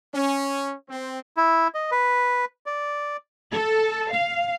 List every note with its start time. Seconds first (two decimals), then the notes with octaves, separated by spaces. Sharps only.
0.13 C#4
0.89 C4
1.37 E4
1.74 D#5
1.91 B4
2.66 D5
3.53 A4
4.14 F5